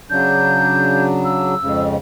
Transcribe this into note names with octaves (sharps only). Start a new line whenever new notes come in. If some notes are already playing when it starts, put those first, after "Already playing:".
C#3 F#3 D4 G6
E6
F2 G#2 C#3